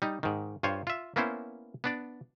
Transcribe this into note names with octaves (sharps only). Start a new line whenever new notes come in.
G3 D#4
G#2 D#3
G2 F4 C5 C#5
F4 E5
A#3 B3 C#4 E4 C5
B3 D4 D5